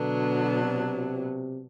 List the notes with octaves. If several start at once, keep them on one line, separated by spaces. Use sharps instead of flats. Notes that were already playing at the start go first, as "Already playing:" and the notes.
Already playing: B2 D3 F#3 B3 D4
C3